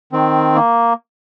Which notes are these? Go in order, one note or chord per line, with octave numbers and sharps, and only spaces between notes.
D#3 C4
A#3